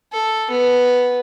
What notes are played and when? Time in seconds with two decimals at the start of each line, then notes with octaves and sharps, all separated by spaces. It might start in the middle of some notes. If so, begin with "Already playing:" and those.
0.12 A4
0.50 B3